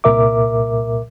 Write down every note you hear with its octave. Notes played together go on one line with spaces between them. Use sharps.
C2 A#2 A#4 E5 D6